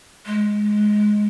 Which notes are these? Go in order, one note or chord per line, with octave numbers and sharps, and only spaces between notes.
G#3